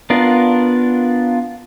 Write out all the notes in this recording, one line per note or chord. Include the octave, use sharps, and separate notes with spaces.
B3 D4 F4 A#4